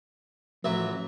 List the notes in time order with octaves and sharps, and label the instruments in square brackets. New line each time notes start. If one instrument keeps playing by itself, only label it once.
[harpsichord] A1 F#3 E5 [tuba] F3